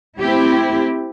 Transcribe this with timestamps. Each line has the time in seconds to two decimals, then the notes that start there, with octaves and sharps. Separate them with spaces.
0.19 A3 C4 E4 G4